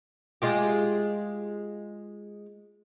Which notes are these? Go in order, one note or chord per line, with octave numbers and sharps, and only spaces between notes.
G#3 F4 G4